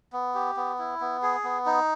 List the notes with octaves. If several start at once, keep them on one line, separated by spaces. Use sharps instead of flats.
B3
G4
B3
E4
B3
G#4
B3
D#4